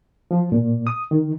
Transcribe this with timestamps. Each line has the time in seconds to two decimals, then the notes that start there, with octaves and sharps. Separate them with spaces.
0.31 F3
0.52 A#2
0.87 D#6
1.11 D#3